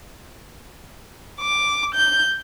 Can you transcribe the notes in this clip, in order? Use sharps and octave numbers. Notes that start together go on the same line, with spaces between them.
D6
G6